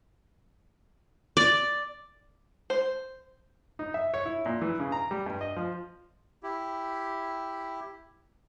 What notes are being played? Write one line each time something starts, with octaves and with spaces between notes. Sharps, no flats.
D5
C5
D#4
E5
C#5
E4
A#2
E3
C#3
A#5
G3
G2
D#5
F3
E4 G4